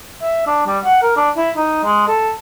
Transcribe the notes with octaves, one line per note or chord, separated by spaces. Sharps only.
E5
D4
G3
F#5
A#4
D4
E4
D#4
G#3
A4